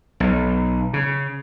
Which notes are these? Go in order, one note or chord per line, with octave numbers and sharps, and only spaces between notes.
B1
C#3